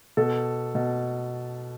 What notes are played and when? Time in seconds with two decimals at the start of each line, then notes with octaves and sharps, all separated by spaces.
0.17 B2 A4
0.75 B2